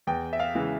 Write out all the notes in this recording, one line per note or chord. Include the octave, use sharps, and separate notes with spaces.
E2 G5
E5
F5
C#3 E3 G#3